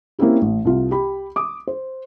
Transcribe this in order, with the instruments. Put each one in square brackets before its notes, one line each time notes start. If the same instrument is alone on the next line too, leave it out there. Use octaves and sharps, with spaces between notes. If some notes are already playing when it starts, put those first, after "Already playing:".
[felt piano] A#3 C4 C#4 E4 G4
A1
C2 F4
G4 B5
D6 D#6
C5